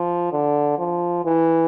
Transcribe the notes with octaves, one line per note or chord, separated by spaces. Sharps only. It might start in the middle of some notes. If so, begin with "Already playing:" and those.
Already playing: F3
D3
F3
E3